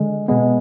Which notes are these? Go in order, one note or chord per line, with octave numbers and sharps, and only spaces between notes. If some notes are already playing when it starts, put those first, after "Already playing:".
Already playing: D3 G#3
B2 G#3 B3